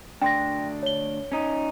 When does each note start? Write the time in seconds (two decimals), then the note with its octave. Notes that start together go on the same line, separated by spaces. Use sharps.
0.22 D2 D4 G5 C6 A#6
0.83 C#5 G7
1.32 C#4 D#4